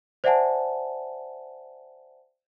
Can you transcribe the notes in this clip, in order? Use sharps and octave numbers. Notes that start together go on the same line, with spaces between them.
C5 D5 E5 F#5 G#5 A5